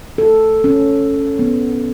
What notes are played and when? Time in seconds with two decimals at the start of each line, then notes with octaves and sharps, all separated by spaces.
0.18 A4
0.64 C#4
1.39 B3